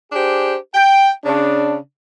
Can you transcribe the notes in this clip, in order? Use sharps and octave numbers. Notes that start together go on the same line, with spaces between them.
D4 G4 G#4 C5
G5
C#3 D4